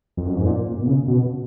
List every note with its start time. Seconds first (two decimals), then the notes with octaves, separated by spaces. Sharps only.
0.17 F2
0.27 F#2
0.37 G#2
0.46 A#2
0.66 A#2
0.81 B2
0.87 C#3
1.08 B2